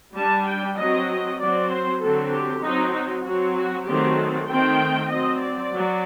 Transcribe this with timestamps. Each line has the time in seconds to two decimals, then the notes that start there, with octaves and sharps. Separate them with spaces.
0.15 G3 D4 A5
0.46 G5
0.77 F#3 C4 D#5
1.39 F#3 C4 D5
1.70 C5
2.01 D3 F#3 C4 A4
2.32 G4
2.62 F#3 C4 D#4
2.93 D#4
3.24 F#3 C4 F#4
3.56 F#4
3.86 D#3 F#3 A3 C4 G4
4.17 A4
4.48 D#3 A3 C4 G5
5.10 F#3 C4 D#5
5.41 D5
5.72 F#3